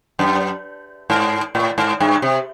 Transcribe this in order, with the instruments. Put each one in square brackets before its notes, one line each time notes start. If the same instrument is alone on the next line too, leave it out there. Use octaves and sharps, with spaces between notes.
[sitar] F#2
G#2
A2
G#2
G2
C3